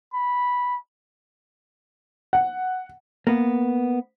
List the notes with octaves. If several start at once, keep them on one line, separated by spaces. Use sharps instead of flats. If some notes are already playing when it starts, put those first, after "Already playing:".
B5
F#5
A#3 B3